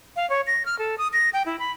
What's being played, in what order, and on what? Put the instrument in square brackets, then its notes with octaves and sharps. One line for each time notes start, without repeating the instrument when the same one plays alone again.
[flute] F5
C#5
A#6
F6
A4
D#6
A#6
G5
E4
B5